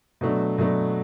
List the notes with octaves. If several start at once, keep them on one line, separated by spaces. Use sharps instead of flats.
B2 F#3 A3 D4
B2 F#3 A3 D4